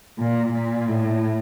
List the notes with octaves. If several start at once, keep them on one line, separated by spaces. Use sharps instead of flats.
A#2
A#2
A2